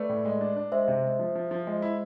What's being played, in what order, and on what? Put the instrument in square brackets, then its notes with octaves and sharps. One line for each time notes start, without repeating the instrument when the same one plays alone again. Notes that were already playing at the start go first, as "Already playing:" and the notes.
Already playing: [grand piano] A3 [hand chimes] B4 D5
[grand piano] A2
G#3
D4
D4
[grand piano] G#3 [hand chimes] C5 E5
[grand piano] C3
G#3
F3
F3
F3
G#3
E4